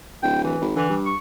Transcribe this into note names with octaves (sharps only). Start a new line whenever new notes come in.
D1 G5
E3
G#1
D3 E3
G2
C#6